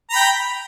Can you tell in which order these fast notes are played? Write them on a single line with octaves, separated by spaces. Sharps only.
A#5 B5 G5